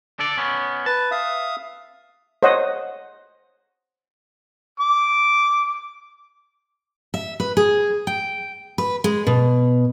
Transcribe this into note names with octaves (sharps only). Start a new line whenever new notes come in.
D4 A4 D5
B3 C#4
B4 A5
E5 F5 D#6
C5 C#5 D#5 F#5
D6
E5
B4
G#4
G5
B4
G#3
B2